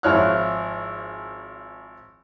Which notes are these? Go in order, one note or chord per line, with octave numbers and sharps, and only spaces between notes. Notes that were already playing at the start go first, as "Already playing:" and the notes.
G#1 F3 E4 C#5 F6 F#6